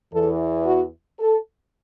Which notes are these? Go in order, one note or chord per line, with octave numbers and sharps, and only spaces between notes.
E2 E3 A4
F#4
A4